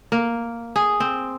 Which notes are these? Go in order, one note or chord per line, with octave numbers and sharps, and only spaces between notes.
A#3
G#4
C4